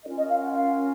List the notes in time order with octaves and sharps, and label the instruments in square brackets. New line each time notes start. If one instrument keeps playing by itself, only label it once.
[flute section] C#4 F4 A#4 D#5
D#5
F5
F#5
F5